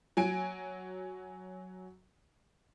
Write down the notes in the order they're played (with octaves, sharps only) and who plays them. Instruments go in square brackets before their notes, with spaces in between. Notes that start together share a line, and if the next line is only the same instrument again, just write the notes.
[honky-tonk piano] F#3 G#5 D7